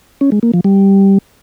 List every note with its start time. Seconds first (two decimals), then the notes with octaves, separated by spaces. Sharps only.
0.21 C#4
0.32 G#3
0.43 A#3
0.54 F3
0.64 G3